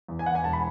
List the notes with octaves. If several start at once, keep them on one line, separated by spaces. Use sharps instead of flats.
E2
G#5
E3 F#5
G#5
E1 A5
B5